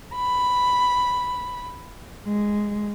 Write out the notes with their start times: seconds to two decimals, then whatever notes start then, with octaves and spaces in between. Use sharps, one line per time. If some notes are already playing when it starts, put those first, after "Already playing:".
0.14 B5
2.24 G#3